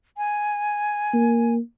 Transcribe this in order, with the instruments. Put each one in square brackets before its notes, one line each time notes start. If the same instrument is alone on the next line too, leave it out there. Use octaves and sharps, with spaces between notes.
[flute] G#5
[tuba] A#3